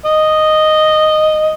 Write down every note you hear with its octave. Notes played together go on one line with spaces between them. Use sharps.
D#5